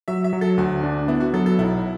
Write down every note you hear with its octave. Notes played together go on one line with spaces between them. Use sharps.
F#3 E5
E5
F#3
A4
D2 F#4
D4
B3 E4
F#4
F#3 A4
A4
B1 E4